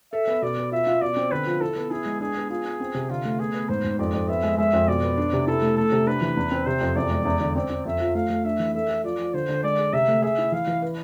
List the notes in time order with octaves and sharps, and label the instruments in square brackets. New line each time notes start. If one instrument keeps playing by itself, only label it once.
[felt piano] A4 [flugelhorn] E5
[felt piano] B3
[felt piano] B2 [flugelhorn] D5
[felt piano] B3
[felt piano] F4 [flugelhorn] E5
[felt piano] F4
[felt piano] B2 [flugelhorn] D5
[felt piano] C4
[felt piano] D3 [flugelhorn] B4
[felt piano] F3
[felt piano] E4 [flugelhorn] A4
[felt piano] B3
[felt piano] E4 [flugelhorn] G#4
[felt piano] G#3
[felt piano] D4 [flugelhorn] G#4
[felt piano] B3
[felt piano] F4 [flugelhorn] G#4
[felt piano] F4
C4
C3
[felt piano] D3 [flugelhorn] F4
[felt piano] A3
[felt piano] B3 [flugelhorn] G#4
[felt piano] B3
[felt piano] G#2 [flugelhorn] C5
[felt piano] G#2
[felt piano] F2 [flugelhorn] D5
[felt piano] F2
[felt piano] B3 [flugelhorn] E5
[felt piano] G#3
[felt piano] G#3 [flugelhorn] E5
[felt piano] F2
[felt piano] B2 [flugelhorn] D5
[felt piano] B3
D4
C3
[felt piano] E4 [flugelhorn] A4
[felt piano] A3
[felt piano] A3 [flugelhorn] A4
[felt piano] C3
[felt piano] D4 [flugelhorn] B4
[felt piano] E3
E2
C4
[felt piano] C3 [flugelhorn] C5
[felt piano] F2
[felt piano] E2 [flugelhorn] D5
[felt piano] G#3
E2
D3
[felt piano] C4 [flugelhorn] D5
[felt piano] C4
[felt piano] F2 [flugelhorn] E5
[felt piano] F3
[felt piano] A3 [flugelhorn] F5
[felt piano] A3
[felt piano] D4 [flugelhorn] E5
[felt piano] E3
[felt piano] A4 [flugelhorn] E5
[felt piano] A4
[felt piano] F3 [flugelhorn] D5
[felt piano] F3
[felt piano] D3 [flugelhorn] C5
[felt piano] D3
[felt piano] G#3 [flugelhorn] D5
[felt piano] G#4
[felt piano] C3 [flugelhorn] E5
[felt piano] A3
[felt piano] G#4 [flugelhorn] E5
[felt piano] E4
[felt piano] E3 [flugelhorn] F5
[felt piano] E3
B4